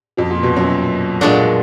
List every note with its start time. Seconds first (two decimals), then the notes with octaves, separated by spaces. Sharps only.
0.17 F2 F3
0.30 A#2
0.43 B2
0.56 F#2 F#3
1.21 A#2 G#3 D4 F#4